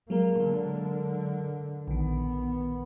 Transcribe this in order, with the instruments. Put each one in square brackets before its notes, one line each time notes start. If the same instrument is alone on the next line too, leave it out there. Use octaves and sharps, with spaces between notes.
[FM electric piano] F#3 G#3 A#4 [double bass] A#3
[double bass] D3
[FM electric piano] A#1 D#3 [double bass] B3